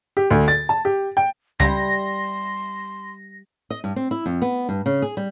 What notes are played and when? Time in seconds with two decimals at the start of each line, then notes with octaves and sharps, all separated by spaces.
0.17 G4
0.31 D2
0.48 A6
0.69 A5
0.85 G4
1.17 G5
1.60 C#2 G3 E4 C6 A#6
3.70 D#5
3.84 G2
3.96 C4
4.11 E4
4.26 F2
4.42 B3
4.69 G2
4.86 C#3
5.02 G#4
5.17 G3